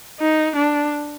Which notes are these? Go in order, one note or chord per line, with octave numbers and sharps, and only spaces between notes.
D#4
D4